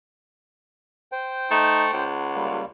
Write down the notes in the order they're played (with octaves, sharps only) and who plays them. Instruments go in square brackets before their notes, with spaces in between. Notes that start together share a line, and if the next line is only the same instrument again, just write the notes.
[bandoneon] C5 G5
[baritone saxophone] A3 [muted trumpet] D#4
[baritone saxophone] C#2 [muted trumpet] F#5
[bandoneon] G3 A#3